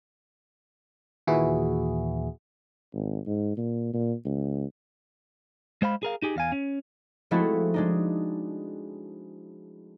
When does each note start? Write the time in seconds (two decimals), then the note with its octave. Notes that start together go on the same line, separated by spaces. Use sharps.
1.27 D#2 A#2 E3 E4 F#4 G#4
2.94 G#1
3.26 G#2
3.57 A#2
3.94 A#2
4.25 C#2
5.82 G#3 C5 F5 B5
6.03 G#4 A#4 F5
6.22 D#4 G4 G#4
6.36 E2 F5 G#5
6.52 C#4
7.31 F3 G#3 A3 C4 E4 F#4
7.74 G#3 D4 D#4